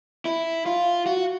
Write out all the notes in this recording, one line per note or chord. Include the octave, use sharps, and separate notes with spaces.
E4
F4
F#4